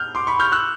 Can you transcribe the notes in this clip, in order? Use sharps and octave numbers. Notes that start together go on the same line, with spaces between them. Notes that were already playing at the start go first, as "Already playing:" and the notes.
Already playing: F6 G6
C6 D6
B5 C#6
F6 G6
E6 F#6